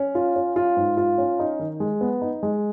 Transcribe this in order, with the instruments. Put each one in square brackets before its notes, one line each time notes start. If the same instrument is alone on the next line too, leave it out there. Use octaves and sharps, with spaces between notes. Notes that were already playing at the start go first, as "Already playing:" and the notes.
Already playing: [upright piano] C#4
F4
C#4
F4
G#2
F4
C#4
D#4
D#3
G#3
B3
D#4
G#3